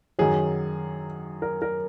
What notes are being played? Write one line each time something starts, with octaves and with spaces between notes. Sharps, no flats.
F#2 D#3 F#3 G#4
A#4
A#4